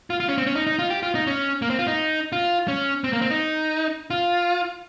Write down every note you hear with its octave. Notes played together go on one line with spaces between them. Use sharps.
F4
F4
C#4
C4
C#4
D#4
D#4
F4
G4
F4
D#4
C#4
A#3
C4
F4
D#4
F4
C#4
C4
A#3
C4
D#4
F4